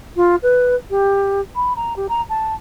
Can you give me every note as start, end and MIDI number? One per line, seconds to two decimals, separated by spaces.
0.16 0.35 65
0.42 0.75 71
0.90 1.40 67
1.55 1.75 83
1.76 1.96 82
1.96 2.06 67
2.09 2.21 82
2.29 2.54 81